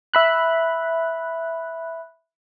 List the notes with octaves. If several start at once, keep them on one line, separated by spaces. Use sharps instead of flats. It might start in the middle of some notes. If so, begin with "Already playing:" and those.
E5 B5 F#6